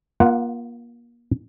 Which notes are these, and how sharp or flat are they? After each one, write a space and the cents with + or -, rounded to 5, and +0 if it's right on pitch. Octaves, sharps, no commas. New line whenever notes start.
A#3 +30 F4 +0 F#5 +5